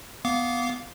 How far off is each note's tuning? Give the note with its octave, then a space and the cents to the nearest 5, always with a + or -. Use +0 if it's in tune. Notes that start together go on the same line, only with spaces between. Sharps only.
B3 +0 F5 +0 D6 -20